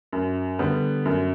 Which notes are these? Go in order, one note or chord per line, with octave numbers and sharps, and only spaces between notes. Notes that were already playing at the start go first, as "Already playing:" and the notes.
F#2
D3 G3 B3
F#2